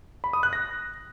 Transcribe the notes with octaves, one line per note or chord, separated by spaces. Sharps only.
B5
D#6
F#6
A#6